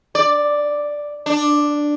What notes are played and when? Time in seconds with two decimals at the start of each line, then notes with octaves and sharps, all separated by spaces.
0.15 D5
1.26 D4